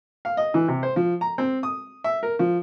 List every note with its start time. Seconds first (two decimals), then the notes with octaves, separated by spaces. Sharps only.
0.25 F5
0.37 D#5
0.54 E3
0.68 C3
0.83 C5
0.96 F3
1.21 A#5
1.38 C4
1.63 D#6
2.04 E5
2.23 A#4
2.39 F3